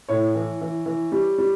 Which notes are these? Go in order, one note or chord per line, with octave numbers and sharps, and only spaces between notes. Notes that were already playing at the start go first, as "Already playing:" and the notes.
A2 C#5
E3
E3
E3
G3
G3